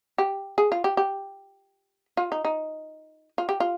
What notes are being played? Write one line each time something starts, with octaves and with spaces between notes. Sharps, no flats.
G4
G#4
F4
G4
G4
F4
D#4
D#4
F4
G4
F4